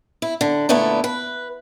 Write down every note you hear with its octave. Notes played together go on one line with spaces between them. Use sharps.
E4
D3
A#2 D3 A3 B3 E4
B4